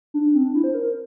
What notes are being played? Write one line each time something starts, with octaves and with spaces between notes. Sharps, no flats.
D4
C4
D4
E4
C5
A#4